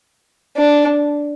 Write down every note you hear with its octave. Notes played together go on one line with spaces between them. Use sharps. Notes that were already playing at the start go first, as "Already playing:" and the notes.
D4